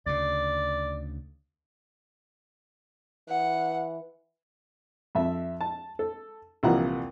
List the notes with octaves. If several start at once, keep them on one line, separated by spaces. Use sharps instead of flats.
D2 C#3 D5
E3 F#5
F2 E5
A5
A4
C2 A#2 E3 F3 F#5 A#5